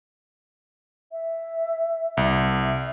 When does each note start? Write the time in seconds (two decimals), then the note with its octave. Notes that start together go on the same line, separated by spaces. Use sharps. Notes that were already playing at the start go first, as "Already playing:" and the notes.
1.12 E5
2.17 C2 E5